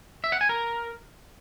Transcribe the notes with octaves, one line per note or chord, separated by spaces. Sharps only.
E5
F#5
G#5
A#4